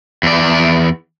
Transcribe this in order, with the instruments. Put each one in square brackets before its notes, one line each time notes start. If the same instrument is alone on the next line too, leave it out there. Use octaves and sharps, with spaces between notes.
[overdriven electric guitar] E2 D5